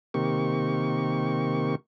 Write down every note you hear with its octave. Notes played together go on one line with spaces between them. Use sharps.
C3 D#3 A#3 G4 C#6